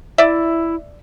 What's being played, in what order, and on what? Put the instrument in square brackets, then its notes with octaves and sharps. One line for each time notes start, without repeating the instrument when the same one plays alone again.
[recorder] E4 [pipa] D5 E5